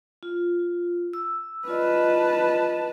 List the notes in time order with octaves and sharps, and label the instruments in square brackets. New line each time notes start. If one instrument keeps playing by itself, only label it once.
[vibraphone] F4
E6
[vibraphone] F4 D5 D#5 [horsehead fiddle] B4 A5